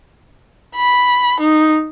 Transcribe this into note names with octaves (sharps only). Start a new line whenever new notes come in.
B5
D#4